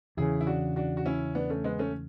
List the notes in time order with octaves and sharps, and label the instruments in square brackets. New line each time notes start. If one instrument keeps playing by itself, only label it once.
[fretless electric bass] E2 C#3 E3 [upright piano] E4 G#4
[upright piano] E4
D4 F#4
D4 F#4
F#4
C#4 E4
B3 D4
A3 C#4
G#3 B3
A3 C#4